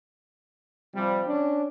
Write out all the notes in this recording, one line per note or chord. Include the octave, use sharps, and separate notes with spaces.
C3 F3 G3
C#4 D4